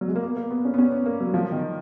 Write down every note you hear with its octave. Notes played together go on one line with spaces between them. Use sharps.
F#3
G#3
A#3
B3
A#3
B3
C#4
B3
C#4
B3
A#3
F#3
F3
D#3